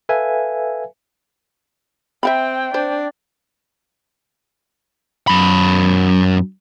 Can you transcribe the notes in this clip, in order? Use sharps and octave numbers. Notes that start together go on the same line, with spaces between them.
A4 B4 E5 F5 G#5
C4 E5 F5 G5 B5
D4 C5
F#2 B5